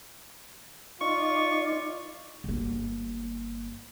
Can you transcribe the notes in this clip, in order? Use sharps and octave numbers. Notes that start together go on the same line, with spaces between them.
D#4 F4 D5 C#6
G1 A#3